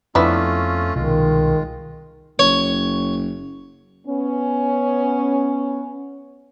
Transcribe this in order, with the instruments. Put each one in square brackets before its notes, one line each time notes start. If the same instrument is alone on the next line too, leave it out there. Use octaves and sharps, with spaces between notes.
[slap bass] F2 F3 [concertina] A3 C#4 F4 [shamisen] B3 D4 E4
[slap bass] C2 B2 [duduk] D#3 [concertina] G#3 F4
[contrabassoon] F#1 [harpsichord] C#5
[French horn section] B3 C#4